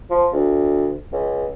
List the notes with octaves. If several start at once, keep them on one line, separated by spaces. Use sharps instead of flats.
F3
D2
C#2